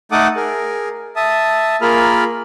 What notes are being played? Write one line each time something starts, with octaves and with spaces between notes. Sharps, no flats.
A3 D#4 A4 F#5 D6 D#6
G#4 A#4
E5 A5 D#6
A#3 F4 G#4 A#4 B5 F6